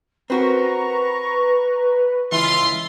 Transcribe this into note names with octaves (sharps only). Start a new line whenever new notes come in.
C4 F#4 A#4 B4 A#5 C#6
C#2 E3 F4 E5 C6